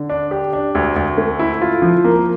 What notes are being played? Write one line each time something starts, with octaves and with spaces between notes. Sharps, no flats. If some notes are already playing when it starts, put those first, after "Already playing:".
Already playing: D3
D4
G4
D4
D2
D2
A3
E4
F4
F3
A#3